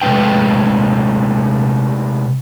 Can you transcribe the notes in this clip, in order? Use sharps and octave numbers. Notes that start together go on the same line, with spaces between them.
C3 G#3 A3 D4 B4 G5